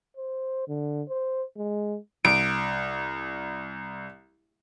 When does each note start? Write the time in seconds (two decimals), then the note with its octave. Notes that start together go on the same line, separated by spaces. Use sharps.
0.17 C5
0.68 D3
1.09 C5
1.57 G#3
2.25 C2 D7